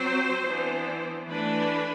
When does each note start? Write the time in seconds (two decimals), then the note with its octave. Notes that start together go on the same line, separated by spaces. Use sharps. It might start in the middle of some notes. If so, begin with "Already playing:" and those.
Already playing: F#3 C4 C5
0.45 E3 B3 D4
1.29 E3 A3 D4 B4